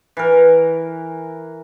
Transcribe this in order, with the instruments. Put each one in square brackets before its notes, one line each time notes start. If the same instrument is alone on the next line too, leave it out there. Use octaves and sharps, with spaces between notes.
[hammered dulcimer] E3 A#4